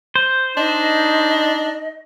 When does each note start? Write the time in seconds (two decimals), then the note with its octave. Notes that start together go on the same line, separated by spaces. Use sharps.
0.15 C5
0.57 D4 D#4 D#5